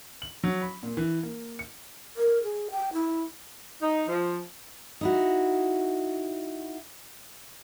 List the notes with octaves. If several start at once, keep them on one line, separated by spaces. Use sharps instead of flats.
F#7
F#3
B5
A#2
E3
A#3
C#7
A#4
G#4
G5
E4
D#4
F3
D#4 E4 F#4